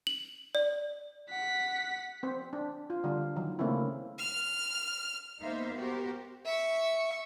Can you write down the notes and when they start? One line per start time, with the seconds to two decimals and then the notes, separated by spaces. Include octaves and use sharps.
0.07 F#7
0.55 D5
1.30 F#5 B6
2.23 C4 C5
2.53 D4
2.90 F4
3.04 D3 G3 D4 F4
3.36 D#3 F#3
3.59 C#3 A3 A#3 C4 C#4 E4
4.18 F6
5.42 A#3 B3 D#4 C5 E5 F5
5.76 B3 F#4 G4 A#4 C5
6.45 E5 C#6